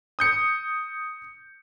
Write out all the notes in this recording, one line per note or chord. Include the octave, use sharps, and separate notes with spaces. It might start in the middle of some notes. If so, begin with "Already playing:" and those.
D#6 G6 C#7